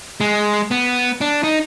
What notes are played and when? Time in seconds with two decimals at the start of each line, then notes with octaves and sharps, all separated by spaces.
0.20 G#3
0.71 B3
1.21 D4
1.43 D#4